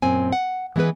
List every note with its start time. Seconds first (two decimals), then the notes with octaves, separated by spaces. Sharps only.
0.02 F#2 A#2 C4 G#5
0.33 F#5
0.76 E3 G#3 B3 G#4 B4